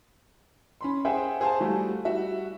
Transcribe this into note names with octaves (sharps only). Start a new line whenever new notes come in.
C#4 B5 C6
G#4 C5 E5 F#5 G5
G#4 C5 F5 A5
G3 A3 F#4
G3 F#4 E5